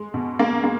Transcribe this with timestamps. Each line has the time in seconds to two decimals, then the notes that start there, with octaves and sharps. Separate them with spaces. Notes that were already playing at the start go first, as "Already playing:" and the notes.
Already playing: G#3
0.14 B2
0.39 G#3 A#3
0.64 G#3 A#3